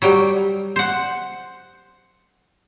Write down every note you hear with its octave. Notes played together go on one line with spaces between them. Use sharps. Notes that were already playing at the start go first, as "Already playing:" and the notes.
F#3 G3 G5
C5 F#5